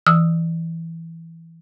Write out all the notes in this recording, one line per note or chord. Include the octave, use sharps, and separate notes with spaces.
E3 D#6 E6